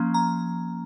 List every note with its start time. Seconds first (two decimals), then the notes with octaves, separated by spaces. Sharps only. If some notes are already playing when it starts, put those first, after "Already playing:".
Already playing: F3 A#3 C#4
0.14 A#5